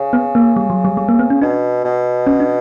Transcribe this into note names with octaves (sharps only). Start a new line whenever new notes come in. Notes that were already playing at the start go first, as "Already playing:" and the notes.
Already playing: C#3
B3
A#3
G3
F#3
G3
G3
A#3
B3
C#4
B2 D4
B2
C#4
D4